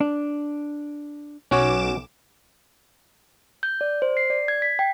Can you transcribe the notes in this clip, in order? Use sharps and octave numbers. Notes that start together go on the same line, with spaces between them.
D4
B1 C#4 F#4 C#5 D6 E7
G6
D5
C5
C7
D5
G#6
B6
G5